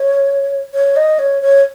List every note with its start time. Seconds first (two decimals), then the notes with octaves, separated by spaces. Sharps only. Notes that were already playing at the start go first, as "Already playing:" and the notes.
Already playing: C#5
0.74 C#5
0.96 D#5
1.19 C#5
1.42 C#5